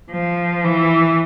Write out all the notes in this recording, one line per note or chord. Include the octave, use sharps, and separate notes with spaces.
F3
E3